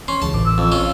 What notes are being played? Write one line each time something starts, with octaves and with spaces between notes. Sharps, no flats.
C#4 C6
C#2 C#3 E3 A5
A1 D6
E6
F2
C#4 F4